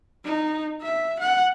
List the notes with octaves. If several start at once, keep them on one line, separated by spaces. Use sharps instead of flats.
D#4
E5
F#5